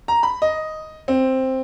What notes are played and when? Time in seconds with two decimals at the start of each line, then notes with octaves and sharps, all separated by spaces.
0.08 A#5
0.23 B5
0.42 D#5
1.08 C4